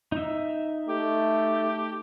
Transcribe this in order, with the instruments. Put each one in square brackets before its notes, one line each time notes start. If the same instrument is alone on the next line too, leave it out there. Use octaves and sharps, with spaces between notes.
[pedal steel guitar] D#4 E5
[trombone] A3 [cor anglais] G4